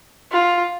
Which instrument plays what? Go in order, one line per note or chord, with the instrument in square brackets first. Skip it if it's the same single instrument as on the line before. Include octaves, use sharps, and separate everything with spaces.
[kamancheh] F4